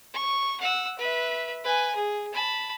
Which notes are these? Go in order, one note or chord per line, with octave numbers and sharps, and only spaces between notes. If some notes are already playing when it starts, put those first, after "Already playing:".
C#6
F#5 E6
B4 E5
B4 G#5
G#4
A5 B5